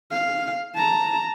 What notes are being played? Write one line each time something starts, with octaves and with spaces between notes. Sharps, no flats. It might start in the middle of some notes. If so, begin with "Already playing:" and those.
F5
A5 A#5